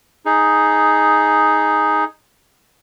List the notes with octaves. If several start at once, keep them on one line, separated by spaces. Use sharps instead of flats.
D#4 G#4